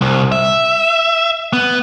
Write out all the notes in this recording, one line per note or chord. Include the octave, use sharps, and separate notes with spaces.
C2
E5
B3